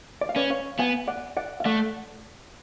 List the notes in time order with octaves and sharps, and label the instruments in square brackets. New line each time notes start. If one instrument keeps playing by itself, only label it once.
[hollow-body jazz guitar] D5
F5
[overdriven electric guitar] C#4 [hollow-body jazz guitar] B4 D5
[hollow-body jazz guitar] C#5 F5
[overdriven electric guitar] B3 [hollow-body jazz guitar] F5 G#5
[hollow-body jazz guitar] D5 F#5
D5 F#5
F5
[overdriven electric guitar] A3 [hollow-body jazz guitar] D5 F#5